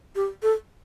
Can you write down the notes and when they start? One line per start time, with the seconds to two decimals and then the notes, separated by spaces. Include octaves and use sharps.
0.16 G4
0.43 A4